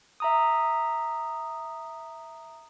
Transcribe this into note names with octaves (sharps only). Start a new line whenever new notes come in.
E5 A#5 D#6